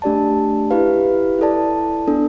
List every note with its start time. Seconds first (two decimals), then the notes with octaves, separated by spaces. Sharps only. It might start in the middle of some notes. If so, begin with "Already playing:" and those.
0.02 A3 D4 G4 D5 A5
0.70 E4 G4 B4 F5
1.39 E4 A4 D5 A5
2.07 B3 D4 A4